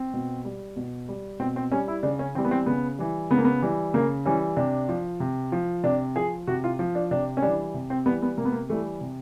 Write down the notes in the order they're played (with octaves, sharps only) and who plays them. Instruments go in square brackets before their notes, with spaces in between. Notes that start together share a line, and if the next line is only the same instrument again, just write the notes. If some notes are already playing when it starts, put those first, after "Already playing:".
Already playing: [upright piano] C4
B2
G3
B2
G3
B2 C4
C4
G3 C#4
E4
C#3 D4
C#4
E3 C4
G3
B3
C4
C#3 B3
E3 G3
C#3 B3
A#3
B3
E3 G3
C#3 A#3
E3 G3 C#4
C3 D4
F3
C3
F3
C3 D4
F3 G#4
C3 F#4
F4
F3
D4
C3 D4
C#4
E3 G3 D4
C3
C4
E3 G3 B3
B3
C3 A#3
B3
A#3
E3 G3 A3
C3